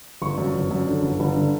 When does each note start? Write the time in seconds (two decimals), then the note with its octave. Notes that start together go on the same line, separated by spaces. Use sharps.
0.22 G1 C#6
0.38 F#2
0.54 G1
0.71 F#2
0.88 D3
1.03 G1
1.20 G1
1.36 D3